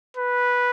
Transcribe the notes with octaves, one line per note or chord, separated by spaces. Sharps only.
B4